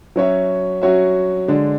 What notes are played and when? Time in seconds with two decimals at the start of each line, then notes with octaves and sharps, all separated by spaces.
0.16 F#3 C#4 F#4 C#5 E5
0.82 F#3 C#4 F#4 C#5 E5
1.48 D3 G#3 D4